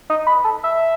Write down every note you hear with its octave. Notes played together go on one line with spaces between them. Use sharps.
D#4
B4
A4
E5